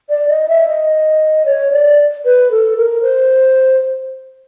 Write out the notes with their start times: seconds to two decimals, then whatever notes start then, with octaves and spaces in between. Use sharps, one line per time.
0.09 D5
0.29 D#5
0.49 E5
0.68 D#5
1.45 C#5
1.72 D5
2.25 B4
2.51 A4
2.77 A#4
3.02 C5